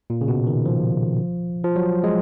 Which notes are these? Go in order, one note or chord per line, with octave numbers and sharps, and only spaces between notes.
A#2
C#3
B2
D#3
F3
F3
F#3
G#3